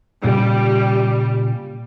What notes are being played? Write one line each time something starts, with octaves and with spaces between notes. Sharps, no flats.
A#2 C#3 G3 F4